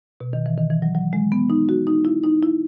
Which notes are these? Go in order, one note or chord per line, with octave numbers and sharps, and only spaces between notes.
B2
D#3
E3
D#3
E3
F#3
F#3
G#3
B3
D#4
F#4
D#4
E4
D#4
E4